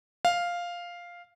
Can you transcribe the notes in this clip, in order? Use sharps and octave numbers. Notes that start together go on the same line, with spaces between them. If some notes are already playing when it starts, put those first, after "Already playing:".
F5